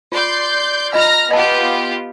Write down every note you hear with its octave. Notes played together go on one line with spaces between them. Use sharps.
F4 D5 C6 G6
F4 D#5 F5 A#5 F6 A#6
B3 F4 G4 D#5 A5